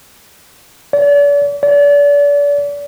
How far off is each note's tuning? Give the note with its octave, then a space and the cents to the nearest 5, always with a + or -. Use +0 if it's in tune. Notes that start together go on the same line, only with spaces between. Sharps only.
D5 -40
D5 -35